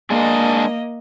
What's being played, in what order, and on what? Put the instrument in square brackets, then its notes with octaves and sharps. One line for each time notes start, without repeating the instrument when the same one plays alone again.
[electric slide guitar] G#3 D4 G#4 [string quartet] A#3 D#5